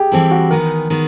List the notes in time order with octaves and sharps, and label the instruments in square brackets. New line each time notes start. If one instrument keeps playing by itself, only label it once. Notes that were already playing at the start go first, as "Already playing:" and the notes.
Already playing: [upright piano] G4 G#4
[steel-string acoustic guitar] E3 G3 C4 E4 A4
[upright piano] F#4
[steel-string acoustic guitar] D#3 G#3 B3 [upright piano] A#4
[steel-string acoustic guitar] D#3 G#3 B3